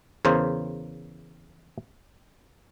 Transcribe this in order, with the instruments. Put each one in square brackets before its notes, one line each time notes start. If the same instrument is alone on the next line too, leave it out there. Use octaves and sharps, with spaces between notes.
[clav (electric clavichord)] E2 C#3 A#4 C5